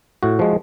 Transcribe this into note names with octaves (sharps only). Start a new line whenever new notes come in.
A2 F#4
F3 G#3